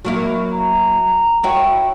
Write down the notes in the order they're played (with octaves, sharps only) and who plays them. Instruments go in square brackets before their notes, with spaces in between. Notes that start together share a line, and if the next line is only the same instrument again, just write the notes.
[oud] F#3 A#3 E4
[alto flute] A#5
[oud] E4 F#4 C#5 [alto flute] G5